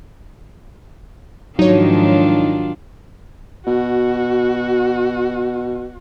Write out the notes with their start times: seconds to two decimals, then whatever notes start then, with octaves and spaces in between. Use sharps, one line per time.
1.59 G#2 D#3 F3 F#3 D4 D#4 F4 C#5
3.66 B2 F#4